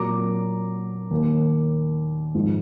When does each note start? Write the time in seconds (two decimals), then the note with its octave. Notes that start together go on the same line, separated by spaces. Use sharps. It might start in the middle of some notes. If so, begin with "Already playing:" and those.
Already playing: A#2 F#3 A#3 A#5 D6
1.11 D#2 D#3 A#3
2.34 G#2 F3 G#3